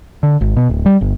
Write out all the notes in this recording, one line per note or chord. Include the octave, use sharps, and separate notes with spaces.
D3
G#1
B2
D1
G3
G1